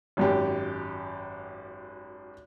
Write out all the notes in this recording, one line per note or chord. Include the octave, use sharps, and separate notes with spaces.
G#1 F#2 G4